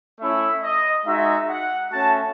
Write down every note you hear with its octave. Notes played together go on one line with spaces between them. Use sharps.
A3 C#4 E4 E5
D#5
G#3 D#4 F#4 E5
F#5
A3 C#4 F#4 A5